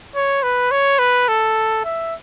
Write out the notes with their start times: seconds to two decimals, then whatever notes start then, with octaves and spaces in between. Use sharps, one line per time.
0.15 C#5
0.43 B4
0.71 C#5
0.99 B4
1.28 A4
1.85 E5